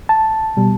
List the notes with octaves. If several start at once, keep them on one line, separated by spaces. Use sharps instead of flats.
A5
B2 G3